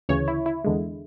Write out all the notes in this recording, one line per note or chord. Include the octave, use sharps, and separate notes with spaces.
D2 C#3 E3 C#5
E4
E4
E2 D3 G#3